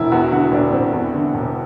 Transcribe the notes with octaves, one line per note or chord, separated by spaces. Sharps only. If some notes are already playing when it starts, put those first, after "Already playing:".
Already playing: E1 E4
E2 F#4
D3 F#4
E1 D4
E1 C4
E2
D3
E1